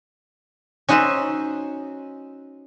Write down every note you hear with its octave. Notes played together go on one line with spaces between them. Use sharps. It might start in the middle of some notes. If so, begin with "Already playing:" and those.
C#4 D#4 F#4 C5 E5